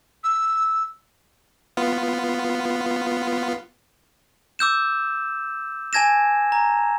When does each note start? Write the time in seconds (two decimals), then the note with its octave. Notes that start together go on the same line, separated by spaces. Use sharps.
0.24 E6
1.77 B3 F4
4.59 D6 E6 G6 E7
5.93 G#5 A5 G#6 A#6 E7
6.52 A#5